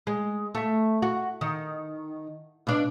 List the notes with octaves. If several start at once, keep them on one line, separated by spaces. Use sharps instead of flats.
G#3
A3 E5
F#4
D#3
B2 D4